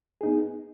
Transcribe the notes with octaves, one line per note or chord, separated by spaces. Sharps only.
B3 D#4 G#4